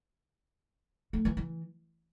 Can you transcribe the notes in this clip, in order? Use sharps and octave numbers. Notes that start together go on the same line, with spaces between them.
A3
E3
E3